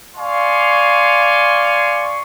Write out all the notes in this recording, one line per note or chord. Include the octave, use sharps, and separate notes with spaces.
D5 F5 G#5 C6 C#6